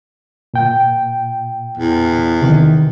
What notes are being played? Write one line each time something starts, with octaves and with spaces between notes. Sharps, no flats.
A#2 G5
E2
C3 D#3